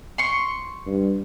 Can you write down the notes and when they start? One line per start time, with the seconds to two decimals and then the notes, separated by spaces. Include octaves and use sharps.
0.18 C6 C#6
0.86 G2